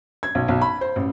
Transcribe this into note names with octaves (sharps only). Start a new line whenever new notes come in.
G#6
B1
B1
B5
C5
A1